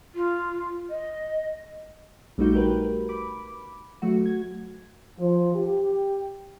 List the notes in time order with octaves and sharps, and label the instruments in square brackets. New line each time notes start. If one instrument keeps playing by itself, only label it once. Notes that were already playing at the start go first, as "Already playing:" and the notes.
[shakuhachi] F4
D#5
[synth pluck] A#1 G3 A3 D#4 F#4 G6
G4 A#4 B4
B5 D6
F#3 A3 F#4
G#6
[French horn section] F3
G4